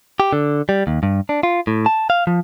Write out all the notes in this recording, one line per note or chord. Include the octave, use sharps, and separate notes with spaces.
G4
D3
G3
D#2
G2
D4
F4
A2
A5
F5
F3